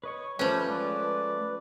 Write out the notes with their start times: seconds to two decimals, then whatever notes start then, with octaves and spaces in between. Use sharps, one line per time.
0.04 B4 C#5 D#5 C#6
0.39 F3 G3 A3 C#4 B4
0.68 G#3 A3 D5